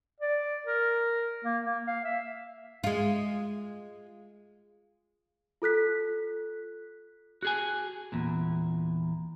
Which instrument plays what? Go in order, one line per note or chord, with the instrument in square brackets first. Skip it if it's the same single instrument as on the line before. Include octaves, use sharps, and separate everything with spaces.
[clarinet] D5
A#4
A#3
A#3
F5
E5
[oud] G#3 F4
[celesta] F4 A4 F#6 B6
[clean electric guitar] F#4 G#4 G#5
E2 A#2